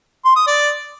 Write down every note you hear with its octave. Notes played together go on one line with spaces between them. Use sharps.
C6
D#6
D5